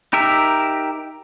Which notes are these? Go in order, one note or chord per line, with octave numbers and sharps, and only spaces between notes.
D#4 G4 A#4 E5